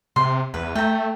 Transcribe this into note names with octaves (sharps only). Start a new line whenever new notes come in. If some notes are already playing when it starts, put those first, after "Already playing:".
C3 C6
E2 B4
A3 G5 A#5